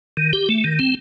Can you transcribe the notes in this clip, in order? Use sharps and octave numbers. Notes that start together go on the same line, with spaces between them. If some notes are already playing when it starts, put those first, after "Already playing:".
D#3
G4
A3
D#3
C4